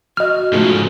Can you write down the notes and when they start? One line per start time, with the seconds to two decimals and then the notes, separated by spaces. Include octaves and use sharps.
0.17 F#4 D#5 F6
0.53 G#2 C#3 F3 A3